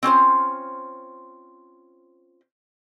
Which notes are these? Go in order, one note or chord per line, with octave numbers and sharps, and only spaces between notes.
C4 C#4 F4 C5